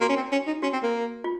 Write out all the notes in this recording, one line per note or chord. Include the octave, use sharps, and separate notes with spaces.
A#3 F#4
C#4
C4
C#4
D#4
C#4 F#4
C4
A#3
F4